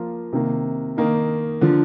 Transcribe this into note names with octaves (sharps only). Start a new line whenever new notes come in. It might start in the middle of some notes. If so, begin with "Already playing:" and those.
Already playing: F3 A#3 F4
C3 D#3 A#3
D#3 A#3 D#4
D3 F3